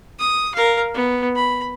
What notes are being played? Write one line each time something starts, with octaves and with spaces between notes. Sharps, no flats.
D#6
A#4 F5
B3
B5